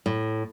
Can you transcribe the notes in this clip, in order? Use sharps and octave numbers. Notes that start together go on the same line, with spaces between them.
A2